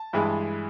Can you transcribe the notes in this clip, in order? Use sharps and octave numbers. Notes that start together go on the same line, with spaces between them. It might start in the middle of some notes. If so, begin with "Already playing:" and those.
Already playing: A5
G2 E3 G#3